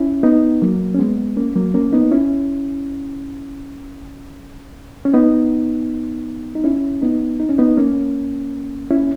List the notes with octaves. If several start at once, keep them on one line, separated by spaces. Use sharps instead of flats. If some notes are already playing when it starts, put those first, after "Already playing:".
Already playing: C#4 E4
B3 D#4
F#3 A#3
C#4
G#3 B3
A#3 C#4
F#3 A#3
A#3 C#4
B3 D#4
C#4 E4
C#4
B3 D#4
D#4
C#4 E4
B3 D#4
D#4
C#4
B3 D#4
A#3 C#4
C#4 E4